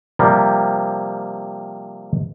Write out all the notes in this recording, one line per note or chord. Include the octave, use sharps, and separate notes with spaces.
C3 F3 G3 A#3